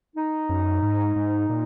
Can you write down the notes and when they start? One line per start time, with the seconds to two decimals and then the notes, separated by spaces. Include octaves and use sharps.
0.16 D#4
0.49 F#2
0.83 G#2
1.16 G#2
1.50 A#2